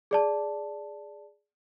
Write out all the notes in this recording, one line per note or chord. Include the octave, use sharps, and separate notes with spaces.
G#4 D5 A5